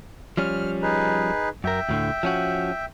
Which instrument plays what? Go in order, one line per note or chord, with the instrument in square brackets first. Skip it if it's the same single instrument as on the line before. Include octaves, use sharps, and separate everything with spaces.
[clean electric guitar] F3 G3 C#4 [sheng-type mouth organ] F6
[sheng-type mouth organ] D#4 G#4 B4
[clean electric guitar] F#2 A#4 [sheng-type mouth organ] E5 G5
[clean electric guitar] D2 A2 D3
F3 C#4 F#4